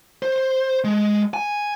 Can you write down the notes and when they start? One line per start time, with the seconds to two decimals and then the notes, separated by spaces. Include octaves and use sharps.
0.22 C5
0.84 G#3
1.34 G#5